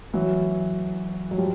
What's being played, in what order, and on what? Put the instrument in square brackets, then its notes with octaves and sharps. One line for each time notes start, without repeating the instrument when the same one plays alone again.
[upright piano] E3 F#3
F#3
F3 G3